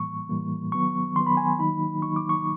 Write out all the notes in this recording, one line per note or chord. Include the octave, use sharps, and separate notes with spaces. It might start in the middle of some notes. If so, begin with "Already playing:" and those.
Already playing: A2 E3 G3 A#3 C#6
A2 E3 G3 A#3
D#3 F#3 B3 C#6
D#3 F#3 B3 C6
B5
G#5
D#3 F#3 A#3 D#4 B5
D#3 F#3 A#3 D#4 C#6
D6
C#6